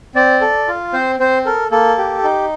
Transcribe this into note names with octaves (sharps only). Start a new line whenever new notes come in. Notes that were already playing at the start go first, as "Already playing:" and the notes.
C4 D5
A4
F4
C4 C5
C4 C5
A4 A#4
A#3 A4
G4
D#4